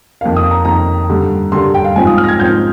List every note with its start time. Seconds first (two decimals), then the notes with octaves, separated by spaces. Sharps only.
0.21 F2 D#3 A#3 F5
0.37 D#6
0.51 A#5
0.65 F2 D#3 A#3 A#5
1.09 G2 D3 G3
1.52 G2 D3 G3 C6
1.74 G5
1.85 F5
1.96 G#2 F3 C4 G#5
2.07 D#6
2.18 F6
2.24 A#6
2.28 G#6
2.39 G#2 F3 C4 G6